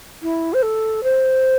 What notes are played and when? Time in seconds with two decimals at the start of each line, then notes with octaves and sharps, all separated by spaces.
0.22 E4
0.53 C5
0.63 A4
1.03 C5